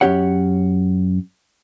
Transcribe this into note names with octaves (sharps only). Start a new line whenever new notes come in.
F#2 D#3 C#4 G4 C#5 F#5